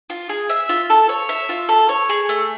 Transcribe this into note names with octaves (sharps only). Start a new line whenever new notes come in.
F4
G#4
E5
F4
A4
C#5
E5
F4
A4
C#5
G#4
A3